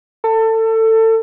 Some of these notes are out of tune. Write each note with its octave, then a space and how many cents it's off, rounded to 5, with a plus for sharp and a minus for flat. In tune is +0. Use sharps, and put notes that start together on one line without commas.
A4 +25